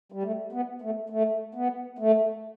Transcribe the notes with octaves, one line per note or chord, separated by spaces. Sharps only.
G3
A3
B3
A3
A3
B3
A3